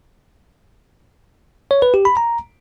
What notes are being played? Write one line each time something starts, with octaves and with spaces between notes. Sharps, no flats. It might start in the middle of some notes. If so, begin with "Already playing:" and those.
C#5
B4
G4
B5
A#5